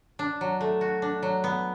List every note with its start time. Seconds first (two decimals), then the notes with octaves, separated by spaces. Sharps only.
0.19 D4
0.41 F#3
0.61 A3
0.81 F#4
1.02 D4
1.23 F#3
1.44 B3